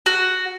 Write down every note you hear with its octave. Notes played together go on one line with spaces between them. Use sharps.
F#4